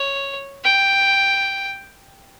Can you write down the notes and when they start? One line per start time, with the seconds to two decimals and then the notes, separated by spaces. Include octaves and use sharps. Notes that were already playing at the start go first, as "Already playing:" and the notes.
Already playing: C#5
0.64 G5